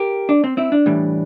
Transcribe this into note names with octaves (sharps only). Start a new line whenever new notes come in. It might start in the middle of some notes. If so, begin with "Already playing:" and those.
Already playing: G4 A#4
D4
C4
C4 E4
D4
A2 E3 G3